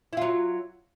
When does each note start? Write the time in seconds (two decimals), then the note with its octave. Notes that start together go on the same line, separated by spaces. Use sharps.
0.13 E4
0.17 F4
0.21 F#3